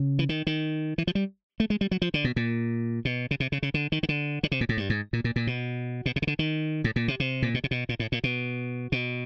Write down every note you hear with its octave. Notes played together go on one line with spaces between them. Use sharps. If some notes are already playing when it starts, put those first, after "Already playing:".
Already playing: C#3
E3
D#3
D#3
E3
F3
G3
A3
G#3
G3
F#3
F3
D3
B2
A#2
B2
C#3
C3
C#3
C#3
D3
D#3
D#3
D3
D3
C3
A#2
A2
G2
G#2
A#2
A#2
A#2
B2
B2
C3
C#3
D3
D#3
A2
A#2
C3
C3
A#2
B2
C3
B2
A#2
A2
A#2
B2
B2